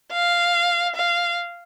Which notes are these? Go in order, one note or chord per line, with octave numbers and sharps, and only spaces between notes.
F5
F5